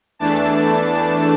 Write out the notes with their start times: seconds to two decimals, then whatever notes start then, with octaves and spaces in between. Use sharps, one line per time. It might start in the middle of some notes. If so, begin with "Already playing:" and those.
0.19 E2 E3 A3 D4 A5